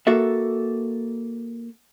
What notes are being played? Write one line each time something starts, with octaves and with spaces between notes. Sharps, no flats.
A#3 F#4 A4 E5